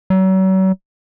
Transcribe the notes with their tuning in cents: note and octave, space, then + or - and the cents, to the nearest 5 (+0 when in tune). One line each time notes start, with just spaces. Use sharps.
F#3 +40